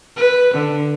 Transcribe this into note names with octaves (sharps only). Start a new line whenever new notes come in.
B4
D3